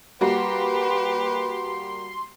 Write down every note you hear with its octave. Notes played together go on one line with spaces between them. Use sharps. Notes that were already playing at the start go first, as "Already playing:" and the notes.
G3 A#3 F#4 G4 B4 C6